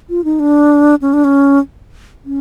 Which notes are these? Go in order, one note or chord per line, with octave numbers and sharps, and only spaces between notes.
F4
D#4
D4
C#4
D4
C#4
C#4